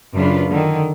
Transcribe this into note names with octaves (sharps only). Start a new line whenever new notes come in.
F#2 C#3 D4 F4 B4
D3 D#3